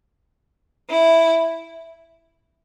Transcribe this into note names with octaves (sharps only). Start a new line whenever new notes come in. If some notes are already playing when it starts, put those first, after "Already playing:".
E4